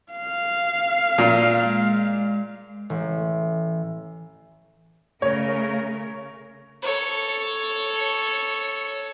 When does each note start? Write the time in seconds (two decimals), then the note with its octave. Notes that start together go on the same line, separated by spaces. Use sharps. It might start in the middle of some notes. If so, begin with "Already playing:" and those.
0.13 F5
1.18 A#2
1.64 G#3
2.90 A1
5.22 C#3 A3 A#4 C#5
6.83 A4 C#5